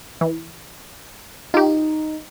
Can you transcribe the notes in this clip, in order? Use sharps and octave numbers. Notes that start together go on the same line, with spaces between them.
E3
D#4 F4 G4